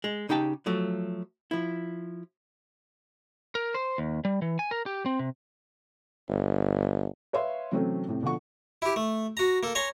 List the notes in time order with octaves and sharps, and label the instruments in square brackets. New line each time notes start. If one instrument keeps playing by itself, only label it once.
[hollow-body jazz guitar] G#3
C#3 D#4 G4 G5 A5
F3 F#3 A3
F3 E4
[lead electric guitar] A#4
C5
D#2
G3
E3
G#5
A#4
G4
C4
C3
[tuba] G1
[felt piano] B4 C#5 E5 F5 C6
C3 E3 F#3 A3 C4 C#4
A2 C3
B2 D3 F3 F#5 C#6
[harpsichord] E4 G4
A3
F#4 A#5
A#3 A4
C#5 G#5 A#5 C6